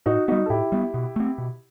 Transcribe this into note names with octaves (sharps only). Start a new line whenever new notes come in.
A2 D#4 F#4
G3 B3 D#4 F#4
A4
A2 E4 G4
G3 B3
B2
A3 C4
B2